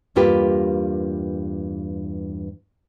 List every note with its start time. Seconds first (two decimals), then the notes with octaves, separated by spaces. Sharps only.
0.16 E2 G2 A#3 F4 G4 B4